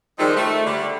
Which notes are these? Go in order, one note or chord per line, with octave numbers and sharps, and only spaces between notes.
D#3 F3 G3 G#3 C4 D#4
A3
D3 G3